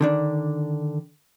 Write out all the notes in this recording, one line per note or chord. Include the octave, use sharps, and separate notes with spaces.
D3 D#3 D4